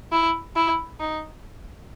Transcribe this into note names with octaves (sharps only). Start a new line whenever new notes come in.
E4
E4
D#4